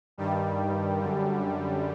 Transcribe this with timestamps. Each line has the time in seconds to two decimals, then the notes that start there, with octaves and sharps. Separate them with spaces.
0.18 G2 D#3 G3
0.98 F#2 D3